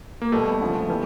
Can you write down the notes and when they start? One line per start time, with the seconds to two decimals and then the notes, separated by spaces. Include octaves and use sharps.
0.22 A#3
0.32 B2 G3 A3 B3
0.60 D2 C#3 F3
0.88 E3 G3 B3